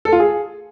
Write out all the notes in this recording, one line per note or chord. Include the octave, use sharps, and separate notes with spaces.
A4
F4
G#4